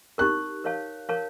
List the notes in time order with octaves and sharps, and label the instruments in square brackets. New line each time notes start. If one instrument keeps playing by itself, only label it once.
[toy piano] D#4 G4 A#4 [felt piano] F#6
[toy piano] A#4 C#5 F5 A5
A#4 C#5 F5 A5